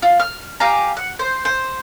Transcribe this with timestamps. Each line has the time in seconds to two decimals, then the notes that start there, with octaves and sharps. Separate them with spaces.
0.02 F4
0.20 F6
0.60 G4 F5 G#5 A#5
0.97 F#5
1.19 C5
1.45 C5